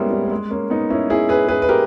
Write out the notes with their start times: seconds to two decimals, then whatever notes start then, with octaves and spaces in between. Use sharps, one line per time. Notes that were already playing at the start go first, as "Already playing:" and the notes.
Already playing: G3 G#3 A#3 B3 C#4 E4
0.11 G3
0.25 A#3
0.31 G#3
0.51 A#3 C#4
0.70 B3 D#4
0.90 C#4 E4
1.10 E4 G#4
1.29 G#4 B4
1.49 G#4 B4
1.62 B4
1.69 G4 A#4